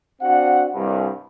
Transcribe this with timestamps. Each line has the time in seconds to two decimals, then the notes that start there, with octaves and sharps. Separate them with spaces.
0.22 C4 D4 F#4 F5 F#5
0.74 C2 G2